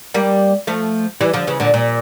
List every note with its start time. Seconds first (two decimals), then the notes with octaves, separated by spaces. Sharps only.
0.14 G3 A#3
0.67 F3 A3
1.21 E3 G3
1.33 D3 F3
1.47 C#3 E3
1.60 A#2 D3
1.74 A#2